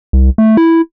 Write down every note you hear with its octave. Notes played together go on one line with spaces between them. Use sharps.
C2
A3
E4